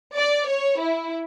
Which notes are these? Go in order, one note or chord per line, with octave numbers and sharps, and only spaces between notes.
D5
C#5
E4